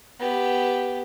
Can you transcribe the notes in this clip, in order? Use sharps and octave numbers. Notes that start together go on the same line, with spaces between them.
B3 G4